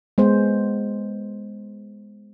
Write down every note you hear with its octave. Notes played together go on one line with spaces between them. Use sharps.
G#3 B3 C5